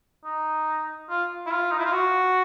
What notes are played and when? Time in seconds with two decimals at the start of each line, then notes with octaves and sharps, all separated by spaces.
0.24 D#4
1.09 F4
1.46 E4
1.51 F4
1.71 D#4
1.78 E4
1.85 F4
1.92 F#4